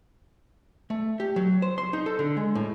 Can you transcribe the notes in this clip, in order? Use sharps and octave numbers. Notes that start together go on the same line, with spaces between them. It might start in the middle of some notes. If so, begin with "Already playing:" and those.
A3
G4
F#3
C5
C6
D#4
A4
D3
G#3
A2